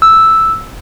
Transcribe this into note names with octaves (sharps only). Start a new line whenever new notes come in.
E6